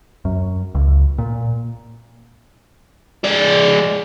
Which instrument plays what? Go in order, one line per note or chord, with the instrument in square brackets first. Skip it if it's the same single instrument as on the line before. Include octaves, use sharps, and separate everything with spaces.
[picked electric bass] F#2
C#2
A#2
[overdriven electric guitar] G#3 D5